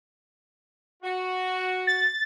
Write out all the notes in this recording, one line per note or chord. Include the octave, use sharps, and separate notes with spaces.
F#4
A6